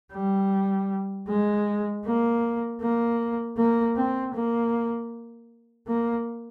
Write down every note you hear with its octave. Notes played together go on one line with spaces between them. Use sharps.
G3
G#3
A#3
A#3
A#3
C4
A#3
A#3